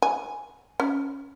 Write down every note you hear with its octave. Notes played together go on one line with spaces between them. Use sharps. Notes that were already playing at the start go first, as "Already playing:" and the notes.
G#5
C#4